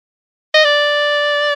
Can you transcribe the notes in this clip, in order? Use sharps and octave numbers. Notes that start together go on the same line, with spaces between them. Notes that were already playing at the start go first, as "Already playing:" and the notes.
D#5
D5